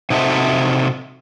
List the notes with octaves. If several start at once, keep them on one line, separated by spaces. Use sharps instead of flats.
C3 D#4 F#4 A4 C5 E5